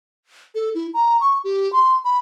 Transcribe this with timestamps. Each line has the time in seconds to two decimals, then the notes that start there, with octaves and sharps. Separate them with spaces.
0.55 A4
0.75 E4
0.94 A#5
1.21 C#6
1.44 G4
1.73 C6
2.05 B5